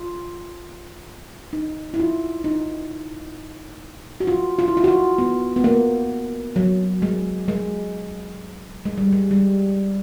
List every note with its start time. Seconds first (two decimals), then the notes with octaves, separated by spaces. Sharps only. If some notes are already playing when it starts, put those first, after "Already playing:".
Already playing: F4
1.53 D#4
1.94 E4
2.00 F4
2.44 D#4
4.20 F#4
4.27 F4
4.59 F4
4.68 E4
4.77 F4
4.84 F#4
4.88 F4
5.18 B3
5.56 B3
5.64 A#3
6.56 F#3
7.02 G#3
7.48 G#3
8.85 G#3
8.98 G3
9.12 G#3
9.31 G3